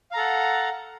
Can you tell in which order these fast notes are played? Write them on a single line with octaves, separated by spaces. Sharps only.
F5 A#5 A4 F#5